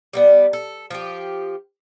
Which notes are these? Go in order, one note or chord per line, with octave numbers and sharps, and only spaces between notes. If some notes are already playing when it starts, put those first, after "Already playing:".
G3 A#3 B3
A4
F3 G4